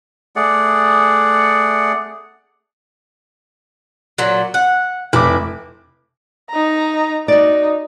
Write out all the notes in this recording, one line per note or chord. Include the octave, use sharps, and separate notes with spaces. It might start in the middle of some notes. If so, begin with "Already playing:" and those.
A3 G#4 D5 F#5
A#2 F#3
F#5
F1 E4 D6
D#4 A#5
D#4 F#4 D5